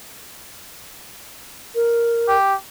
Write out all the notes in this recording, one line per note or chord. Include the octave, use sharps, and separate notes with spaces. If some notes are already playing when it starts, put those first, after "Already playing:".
A#4
G4